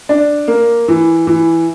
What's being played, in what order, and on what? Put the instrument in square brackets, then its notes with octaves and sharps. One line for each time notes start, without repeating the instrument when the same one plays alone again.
[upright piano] D4
A#3
E3
E3